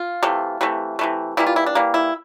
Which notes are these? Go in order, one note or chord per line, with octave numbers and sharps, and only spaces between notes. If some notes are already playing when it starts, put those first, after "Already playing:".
Already playing: F4
C3 E3 A3
C3 E3 A3
C3 E3 A3
E3 G3 A#3 E4
F4
E4
D4
E3 G3 A#3
E4